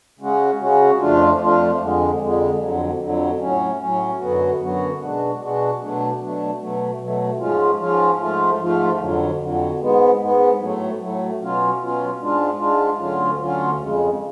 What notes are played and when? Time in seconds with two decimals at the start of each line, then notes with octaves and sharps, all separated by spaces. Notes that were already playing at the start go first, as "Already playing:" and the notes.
0.19 C#3 G#3 C#4 F#4
0.59 C#3 G#3 C#4 F#4
0.99 F2 F3 A3 D4 F4
1.38 F2 F3 A3 D4 F4
1.79 F2 D3 G#3
2.19 F2 D3 G#3
2.59 F2 D3 F#3
2.99 F2 D3 F#3
3.38 A2 F#3 C#4
3.79 A2 F#3 C#4
4.19 F#2 D3 F#3 B3 F#4
4.59 F#2 D3 F#3 B3 F#4
4.99 B2 G#3 D4 F#4
5.38 B2 G#3 D4 F#4
5.79 B2 F#3 A3 D4
6.19 B2 F#3 A3 D4
6.59 B2 F#3 A3
6.98 B2 F#3 A3
7.38 G#2 F3 G#3 C#4 F4
7.78 G#2 F3 G#3 C#4 F4
8.19 G#2 F3 A3 F4
8.58 G#2 F3 A3 F4
8.98 F2 D3 F#3
9.39 F2 D3 F#3
9.79 G#2 G#3 B3
10.19 G#2 G#3 B3
10.58 A2 F#3 A3
10.98 A2 F#3 A3
11.38 B2 F#3 C#4 F4
11.78 B2 F#3 C#4 F4
12.19 G#2 G#3 D4 F4
12.58 G#2 G#3 D4 F4
12.98 D2 D3 F#3 C#4 F4
13.39 D2 D3 F#3 C#4 F4
13.78 F2 C#3 G#3